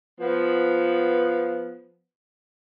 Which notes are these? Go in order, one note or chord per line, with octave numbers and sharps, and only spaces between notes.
F3 B3